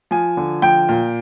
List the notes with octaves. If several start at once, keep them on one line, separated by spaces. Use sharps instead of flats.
F3 G#5
D3
F3 G5
A#2